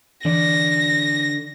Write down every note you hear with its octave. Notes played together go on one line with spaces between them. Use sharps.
D3 E3 D5 A#6